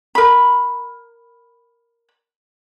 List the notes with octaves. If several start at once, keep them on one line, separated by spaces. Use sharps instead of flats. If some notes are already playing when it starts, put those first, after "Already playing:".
A#4 B5